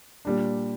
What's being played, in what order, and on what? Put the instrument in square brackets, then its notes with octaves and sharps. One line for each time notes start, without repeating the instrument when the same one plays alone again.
[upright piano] A#2 G3 D4